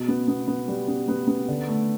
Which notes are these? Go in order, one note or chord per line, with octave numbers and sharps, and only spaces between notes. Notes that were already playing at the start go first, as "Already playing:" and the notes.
Already playing: B2
B3
B3
B3
G3
B3
B3
B3
D3
A3